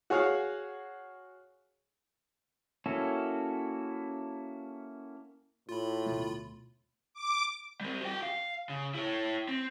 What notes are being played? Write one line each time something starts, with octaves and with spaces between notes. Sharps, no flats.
F#4 G#4 C#5 F5 F#5
A#3 C#4 E4 F#4 A4
A2 F4 B5
D1 B2 A3
D6
G3 C4
F#4 G5
F5
C#3
E4 C#5
C4